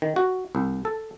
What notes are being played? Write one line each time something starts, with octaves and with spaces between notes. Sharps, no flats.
D#3
F#4
C2
A4